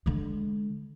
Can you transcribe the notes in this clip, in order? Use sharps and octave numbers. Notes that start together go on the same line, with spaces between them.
D3 G#3